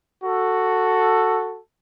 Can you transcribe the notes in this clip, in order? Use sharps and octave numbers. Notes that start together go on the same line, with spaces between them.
F#4 A4